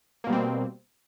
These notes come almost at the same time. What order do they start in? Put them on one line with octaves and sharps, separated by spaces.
A#3 B2 G3 C4